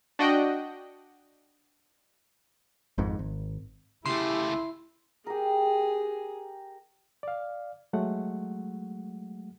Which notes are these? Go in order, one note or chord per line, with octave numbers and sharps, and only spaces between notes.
D4 F#4 D#5 F#5 G5
G#1 F2 G#2
G#1
C#3 A3 E4 G4 C6
G4 G#4 A#4
D5 F5
F#3 G#3 A3 F#5